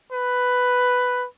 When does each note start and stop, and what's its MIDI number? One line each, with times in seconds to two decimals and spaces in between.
0.12 1.26 71